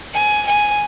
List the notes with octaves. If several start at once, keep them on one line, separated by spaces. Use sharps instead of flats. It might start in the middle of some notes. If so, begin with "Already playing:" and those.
G#5
G#5